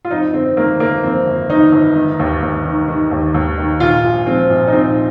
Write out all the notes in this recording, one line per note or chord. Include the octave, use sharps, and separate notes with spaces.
F4
F2 D#4
G1 C4
D#3 A#3
G1 A#3
F2 C4
G1
D#3 D#4
G1
D#3
D#2
D#2
D#3
D#3
D#2
D#2
D#3
A#2 F4
A#1
F3 C4
A#1
D#4
A#2 C4